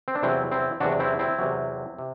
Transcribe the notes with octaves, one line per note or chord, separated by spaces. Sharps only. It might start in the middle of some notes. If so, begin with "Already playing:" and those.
C4
D4
E2 C3 F#3 C4 E4
C4 E4
E2 C3 F#3 D4 F#4
C4 E4
C4 E4
E2 C3 F#3
C3